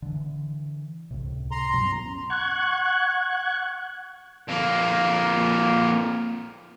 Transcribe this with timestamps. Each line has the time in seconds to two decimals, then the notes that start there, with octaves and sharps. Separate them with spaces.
0.02 D3 E3
1.11 C#2 A2 C3
1.51 A#5 C6
1.73 G2 B2 F#3
1.85 B3 C#4
2.30 F#5 C#6 F#6 G#6
4.49 F2 A#3